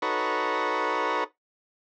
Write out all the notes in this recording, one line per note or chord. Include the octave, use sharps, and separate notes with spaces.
D#4 F#4 A4 B4 C#5 A#5